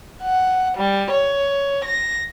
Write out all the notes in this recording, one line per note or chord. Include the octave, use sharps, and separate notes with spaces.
F#5
G3
C#5
A#6